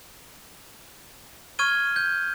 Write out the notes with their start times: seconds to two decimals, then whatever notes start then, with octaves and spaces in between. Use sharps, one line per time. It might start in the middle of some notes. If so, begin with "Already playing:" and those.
1.59 C#6 F6 G#6 D#7 G7
1.96 G6